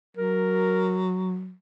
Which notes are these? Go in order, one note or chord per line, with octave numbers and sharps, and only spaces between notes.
F#3 A#4